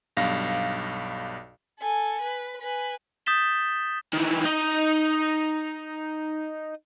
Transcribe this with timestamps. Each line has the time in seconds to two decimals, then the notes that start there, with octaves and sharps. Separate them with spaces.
0.17 B1 G2 F5 A#6
1.80 A4 G#5
2.21 B4
2.61 B4 G#5
3.26 D#6 G6 A6 B6 E7 G7
4.13 D#3 E3
4.45 D#4 D#5